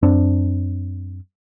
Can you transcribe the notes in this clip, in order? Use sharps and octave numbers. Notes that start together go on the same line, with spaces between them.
F#2 C4 D4